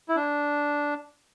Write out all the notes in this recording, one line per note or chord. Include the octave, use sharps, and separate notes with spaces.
E4
D4